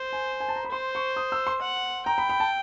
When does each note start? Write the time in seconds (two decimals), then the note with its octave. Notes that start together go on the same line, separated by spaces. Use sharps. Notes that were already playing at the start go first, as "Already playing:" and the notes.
Already playing: C5
0.13 G#5
0.40 G#5
0.49 A5
0.56 A#5
0.65 B5
0.72 C5 C6
0.95 C#6
1.17 D#6
1.32 E6
1.47 C6
1.62 F#5
2.06 G5 A#5
2.18 B5
2.29 B5
2.40 A5